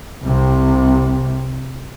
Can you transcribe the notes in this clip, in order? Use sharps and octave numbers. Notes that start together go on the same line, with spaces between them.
C2 C3